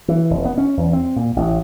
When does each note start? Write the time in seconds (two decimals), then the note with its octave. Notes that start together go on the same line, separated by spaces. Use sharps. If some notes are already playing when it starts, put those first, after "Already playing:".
0.08 E3
0.31 F1
0.45 B3
0.58 C#4
0.77 E2
0.93 C4
1.16 A#2
1.36 A1